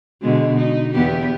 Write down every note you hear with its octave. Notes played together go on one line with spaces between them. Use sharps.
B2 D3 G#3
D#4
E2 B3 G4